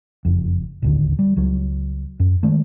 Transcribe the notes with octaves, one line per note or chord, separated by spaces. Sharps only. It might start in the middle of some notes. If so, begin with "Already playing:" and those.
F#1 F2
D1 G#1 D#2 D3
G3
C#2 F#3
F#2
D#3 G#3 A3